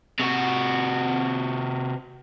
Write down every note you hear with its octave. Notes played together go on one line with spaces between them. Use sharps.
C3 F#4